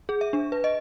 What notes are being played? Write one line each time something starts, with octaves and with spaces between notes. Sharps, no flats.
G#4
E5
D4
B4
D#5